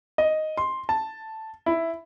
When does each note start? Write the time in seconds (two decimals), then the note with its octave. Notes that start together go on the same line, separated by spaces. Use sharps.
0.18 D#5
0.57 C6
0.89 A5
1.66 E4